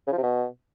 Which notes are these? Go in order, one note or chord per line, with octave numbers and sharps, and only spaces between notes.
C#3
F3
C3
B2